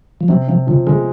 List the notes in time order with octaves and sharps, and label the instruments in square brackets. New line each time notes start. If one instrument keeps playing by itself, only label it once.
[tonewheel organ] F3
[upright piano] C3 [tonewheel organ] F#3
[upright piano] C3 [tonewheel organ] F3
[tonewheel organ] C#3 [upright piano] F3
[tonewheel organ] D3 [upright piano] G#3